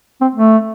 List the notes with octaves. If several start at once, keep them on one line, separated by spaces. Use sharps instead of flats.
C4
A3